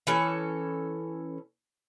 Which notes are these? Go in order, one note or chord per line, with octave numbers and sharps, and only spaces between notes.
E3 C#4 A4